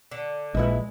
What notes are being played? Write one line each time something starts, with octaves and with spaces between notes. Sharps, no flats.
D3
A#1 G#3 E4 B4 D#5